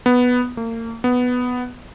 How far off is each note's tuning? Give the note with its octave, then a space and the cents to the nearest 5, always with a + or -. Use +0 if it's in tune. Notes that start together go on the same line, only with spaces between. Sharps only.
B3 +0
A#3 -35
B3 +5